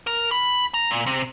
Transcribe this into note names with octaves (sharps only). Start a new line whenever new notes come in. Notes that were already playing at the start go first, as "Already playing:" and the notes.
A#4
B5
A#5
A#2
C3